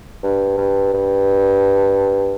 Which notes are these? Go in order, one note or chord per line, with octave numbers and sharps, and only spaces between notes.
G2
G2
G2